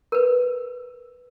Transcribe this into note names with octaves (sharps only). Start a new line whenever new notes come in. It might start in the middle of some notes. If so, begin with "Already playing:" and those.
A#4 B4